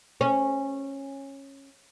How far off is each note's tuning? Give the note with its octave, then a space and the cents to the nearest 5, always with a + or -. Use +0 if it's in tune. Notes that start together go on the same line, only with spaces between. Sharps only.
C#4 -15